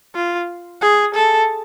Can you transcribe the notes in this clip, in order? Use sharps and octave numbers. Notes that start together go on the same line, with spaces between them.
F4
G#4
A4